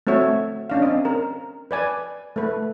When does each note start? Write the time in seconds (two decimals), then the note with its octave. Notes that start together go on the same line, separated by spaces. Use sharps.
0.07 A3 C4 F#4 C#5 E5
0.70 C#4 D4 F5
0.82 C4 D#5
1.05 A#4
1.71 B4 D5 G#5
2.36 A3 B4